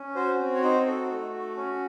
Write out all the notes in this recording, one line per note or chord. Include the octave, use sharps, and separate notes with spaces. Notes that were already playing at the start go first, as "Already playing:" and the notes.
Already playing: C#4
F#4 C5
C4
C#5
D#4 C5
F#4 A4
A3
F#4
C#4